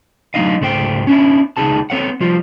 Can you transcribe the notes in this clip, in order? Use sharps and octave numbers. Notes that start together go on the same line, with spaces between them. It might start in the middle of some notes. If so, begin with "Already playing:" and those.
F#3 A3 D4 D#4 D#5 F5
C#2 G#2 A3 C5 G5
C#4 D4 E4
C#2 A#2 D#4 E4 G#4 A5
B3 C4 A4 C#5 F5 F#5
F3 G3 F4